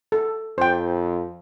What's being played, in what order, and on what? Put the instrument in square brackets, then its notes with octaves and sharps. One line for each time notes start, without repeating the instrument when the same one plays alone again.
[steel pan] A4
[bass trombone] F2 [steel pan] C5 G5